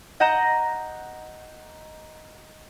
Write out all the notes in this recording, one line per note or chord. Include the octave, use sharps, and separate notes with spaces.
D#5 F#5 A#5 G6 A#6 E7